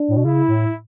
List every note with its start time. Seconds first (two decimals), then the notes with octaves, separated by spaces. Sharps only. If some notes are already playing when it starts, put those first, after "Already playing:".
Already playing: D4
0.08 A2
0.17 B2
0.25 C#3 E4
0.48 A2